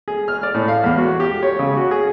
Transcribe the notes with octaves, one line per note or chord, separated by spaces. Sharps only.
G#4
F6
D5
A2
F5
E2
F#4
G4
C#5
C#3
F#4
G#4